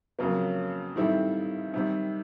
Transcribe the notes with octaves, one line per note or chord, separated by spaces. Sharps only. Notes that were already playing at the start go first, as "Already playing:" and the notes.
F2 C#3 F#3 A#3
D#3 G3 C4 E4 A4
C3 D#3 G3 C4